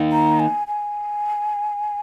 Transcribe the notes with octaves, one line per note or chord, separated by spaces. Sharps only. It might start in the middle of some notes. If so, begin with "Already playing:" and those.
Already playing: D#3 A#3 D#4
A#5
G#5
G#5